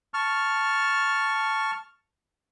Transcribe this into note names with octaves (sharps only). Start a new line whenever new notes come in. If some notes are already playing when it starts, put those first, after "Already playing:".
A5 C#6 F6